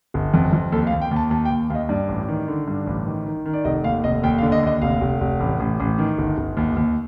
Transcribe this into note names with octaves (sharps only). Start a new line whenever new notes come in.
G1
F2
F2
D#2 A4
F5
D#2
G5
D#2
A5
D#2 A5
G5
D#2
D#2 D#5 F5
G2 D5
A1
D#3
D3
G2
A1
D#3
D#3
D#3
D5
F1 D#5
D#2 F5
F1 D#5
D#2 G5
F5
D3
D#5
D#2 D#5
F1 F5
F1
F1
A1
A1
A1
D#3
G1
G1
D#2
D#2